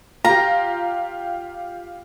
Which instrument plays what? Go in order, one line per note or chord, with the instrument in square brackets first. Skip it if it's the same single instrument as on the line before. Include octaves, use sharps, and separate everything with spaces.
[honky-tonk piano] F4 G4 [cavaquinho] A#5